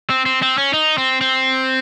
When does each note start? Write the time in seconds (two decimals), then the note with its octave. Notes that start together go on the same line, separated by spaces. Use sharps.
0.10 C4
0.26 C4
0.42 C4
0.58 C#4
0.74 D#4
0.98 C4
1.21 C4